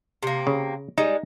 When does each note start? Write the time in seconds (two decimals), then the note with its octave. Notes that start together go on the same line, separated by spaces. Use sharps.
0.23 C3 A#3
0.47 C#3
0.98 G3 G#3 D#4